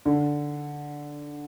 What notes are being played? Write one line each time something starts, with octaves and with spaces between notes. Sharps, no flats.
D3